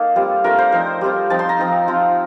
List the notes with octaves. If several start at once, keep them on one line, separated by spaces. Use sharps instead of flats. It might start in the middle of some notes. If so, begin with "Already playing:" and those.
Already playing: A#3 D#4 A4
G3 C4 F4
A3 D4 F4 A#4
C5
F3 C4 D#4 C5
G3 C4 F4
F3 C4 D#4 A5
C6
A#5
F3 C4 D#4
F3 C4 F4